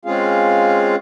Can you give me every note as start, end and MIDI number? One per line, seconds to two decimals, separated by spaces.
0.05 0.96 56
0.05 0.96 60
0.05 0.96 61
0.05 0.96 65
0.05 0.96 68
0.05 0.96 77